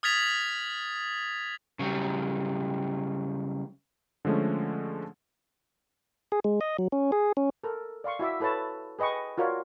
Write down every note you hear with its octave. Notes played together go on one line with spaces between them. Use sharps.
D#6 F6 G#6 A6 B6 F7
C#3 F#3 G3
D3 F3 G#3 A3 C#4
G#4
G#3
D#5
F#3
C#4
G#4
C#4
A4 A#4
D5 F5 C6 C#6
E4 F#4 E5 D6
E4 A4 B4 C#5 A5
G#4 B4 D#5 G5 C#6
F4 F#4 A#4 C#5 D5